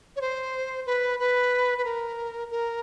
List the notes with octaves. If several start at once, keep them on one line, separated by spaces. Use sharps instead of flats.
C#5
C5
B4
B4
B4
A#4
A#4